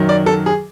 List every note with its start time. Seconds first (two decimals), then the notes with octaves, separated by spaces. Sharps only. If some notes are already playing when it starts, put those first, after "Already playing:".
Already playing: F#2 D#3 F#3
0.09 D5
0.26 A4
0.46 G#4